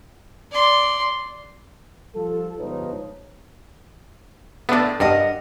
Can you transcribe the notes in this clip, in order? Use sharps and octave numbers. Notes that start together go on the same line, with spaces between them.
D5 C6
F3 G3 F4 A4
G1 G#2 F3 D#4 B4 C#5
A2 A3 B3 D4
G2 A#4 D#5 F#5